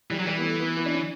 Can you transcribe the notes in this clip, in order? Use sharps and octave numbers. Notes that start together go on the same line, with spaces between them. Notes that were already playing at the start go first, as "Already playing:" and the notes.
E3 G3
F#3
E3 G3
B3
A3
B3
B3
D4
C#4